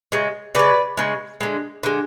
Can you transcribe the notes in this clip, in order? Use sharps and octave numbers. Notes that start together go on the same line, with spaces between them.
C#3 G#3
C#3 G#3 B4 D5
C#3 G#3
D3 G#3
D3 G#3